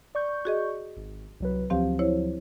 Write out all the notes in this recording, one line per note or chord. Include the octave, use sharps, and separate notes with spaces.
D5 C#6 G6
F#4 G#4 D#5
G#1
C2 F#3 B4
D2 F3 F#3 C4 G4 F5
E4 C5 C#5